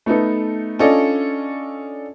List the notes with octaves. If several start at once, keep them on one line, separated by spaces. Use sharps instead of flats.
A3 B3 D#4 A4
C#4 D4 F4 A4 D5 D#5